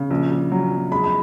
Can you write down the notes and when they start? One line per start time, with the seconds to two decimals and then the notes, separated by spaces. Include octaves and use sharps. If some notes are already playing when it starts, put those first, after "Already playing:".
Already playing: C#3
0.10 A#1
0.31 A#1
0.52 F#3
0.71 A#1
0.91 G#3 B5
1.04 B5